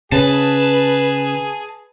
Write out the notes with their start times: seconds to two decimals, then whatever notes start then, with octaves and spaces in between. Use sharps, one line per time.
0.12 C#3 G#4 B4 A5